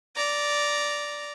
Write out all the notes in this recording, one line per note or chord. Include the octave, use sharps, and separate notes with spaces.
D5 A#5